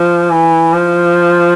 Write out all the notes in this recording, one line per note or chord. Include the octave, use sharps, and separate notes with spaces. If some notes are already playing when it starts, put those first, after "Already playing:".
Already playing: F3
E3
F3